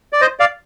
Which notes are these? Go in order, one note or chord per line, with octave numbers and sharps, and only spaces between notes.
D5
C5 D#5
D5 F5